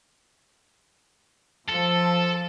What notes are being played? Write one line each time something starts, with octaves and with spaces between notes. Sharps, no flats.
F3 A4